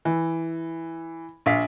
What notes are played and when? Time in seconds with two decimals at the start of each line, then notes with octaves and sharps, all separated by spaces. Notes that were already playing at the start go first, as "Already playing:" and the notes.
0.05 E3
1.46 A#1 F5 B6